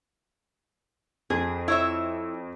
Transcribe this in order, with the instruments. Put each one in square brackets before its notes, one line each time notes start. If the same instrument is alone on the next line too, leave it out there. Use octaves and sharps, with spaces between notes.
[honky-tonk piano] F2 [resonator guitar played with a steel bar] G#4
[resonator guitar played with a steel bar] E4 C#5 E5